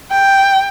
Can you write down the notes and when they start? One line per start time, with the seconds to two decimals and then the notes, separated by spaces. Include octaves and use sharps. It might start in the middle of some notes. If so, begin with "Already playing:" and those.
0.11 G5